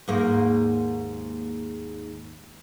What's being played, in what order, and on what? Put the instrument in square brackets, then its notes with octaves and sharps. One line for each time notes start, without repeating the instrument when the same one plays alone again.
[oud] D#2 G#2 A#3